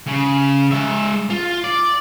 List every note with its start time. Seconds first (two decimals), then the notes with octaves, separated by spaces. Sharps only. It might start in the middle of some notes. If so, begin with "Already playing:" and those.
0.07 C#3
0.72 G#3 E5
1.30 F4
1.64 D5